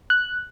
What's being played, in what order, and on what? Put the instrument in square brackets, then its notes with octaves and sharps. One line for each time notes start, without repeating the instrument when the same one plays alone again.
[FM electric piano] F#6